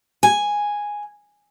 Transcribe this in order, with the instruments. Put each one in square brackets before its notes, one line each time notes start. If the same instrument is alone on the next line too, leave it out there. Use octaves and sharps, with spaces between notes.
[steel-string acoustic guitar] G#5